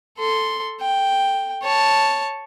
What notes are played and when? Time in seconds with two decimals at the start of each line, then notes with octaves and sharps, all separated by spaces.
0.18 A4 C6
0.81 G5
1.63 C#5 A5